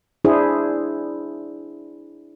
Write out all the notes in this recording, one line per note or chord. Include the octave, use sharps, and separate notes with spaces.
D4 E4 G#4 C5